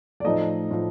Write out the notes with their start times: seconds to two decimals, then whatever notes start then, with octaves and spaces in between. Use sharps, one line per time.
0.20 D5
0.24 A2 F3 A3 D#4 D#5
0.71 A2 F3 A3